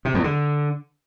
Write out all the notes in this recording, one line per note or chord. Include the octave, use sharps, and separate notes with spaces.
C3
E2
D3